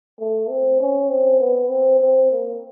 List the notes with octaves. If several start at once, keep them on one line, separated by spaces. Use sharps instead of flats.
A3
C4
C#4
C4
B3
C4
C4
A#3